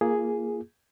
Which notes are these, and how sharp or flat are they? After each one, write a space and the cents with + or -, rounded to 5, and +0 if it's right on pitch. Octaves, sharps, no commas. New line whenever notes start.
A#3 +0 F4 -25 G#4 +0